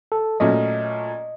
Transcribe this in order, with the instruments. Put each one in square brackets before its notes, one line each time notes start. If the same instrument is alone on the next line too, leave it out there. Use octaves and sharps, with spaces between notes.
[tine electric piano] A4
[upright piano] A#2 F#3 A3 C#4 [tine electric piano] D#5